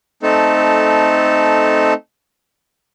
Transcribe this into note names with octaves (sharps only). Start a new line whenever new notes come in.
A3 C4 D#4 A4